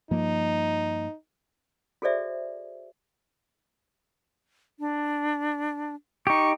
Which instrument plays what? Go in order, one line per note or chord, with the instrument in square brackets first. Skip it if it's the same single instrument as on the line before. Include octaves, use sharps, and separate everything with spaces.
[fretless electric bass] G2 F3 A#3 [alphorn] D#4
[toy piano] F#4 G#4 A4 C5 D5 E5
[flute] D4
[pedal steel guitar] D#4 G4 [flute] C#6